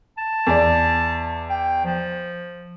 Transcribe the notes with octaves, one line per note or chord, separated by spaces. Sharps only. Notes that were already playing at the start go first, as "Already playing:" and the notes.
A5
E2 D5
G5
F3